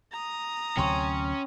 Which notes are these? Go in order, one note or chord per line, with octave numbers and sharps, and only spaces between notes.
A#5 D#6
D2 C3 F#3 C#4 G5 C6 C#6